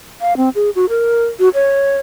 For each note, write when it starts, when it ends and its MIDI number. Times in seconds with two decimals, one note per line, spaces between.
0.21 0.37 77
0.37 0.49 60
0.55 0.70 68
0.76 0.86 66
0.89 1.24 70
1.40 1.49 66
1.54 1.99 73